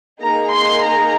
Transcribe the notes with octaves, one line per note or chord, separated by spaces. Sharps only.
A#3 D#4 G#4 A#5
C6
A#5